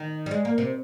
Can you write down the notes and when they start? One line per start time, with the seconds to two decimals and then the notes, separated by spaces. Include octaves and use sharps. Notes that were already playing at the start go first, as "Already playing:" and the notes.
Already playing: D#3 D#5
0.26 G3
0.31 G#3 D5
0.45 A#3
0.51 A#4
0.58 C3